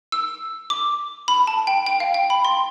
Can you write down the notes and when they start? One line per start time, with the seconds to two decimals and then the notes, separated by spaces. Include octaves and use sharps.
0.12 E6
0.70 D6
1.28 B5
1.47 A5
1.67 G5
1.86 G5
2.00 F5
2.14 G5
2.30 B5
2.45 C6